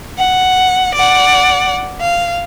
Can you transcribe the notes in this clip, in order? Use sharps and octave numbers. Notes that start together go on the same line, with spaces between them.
F#5
D5 F#5
F5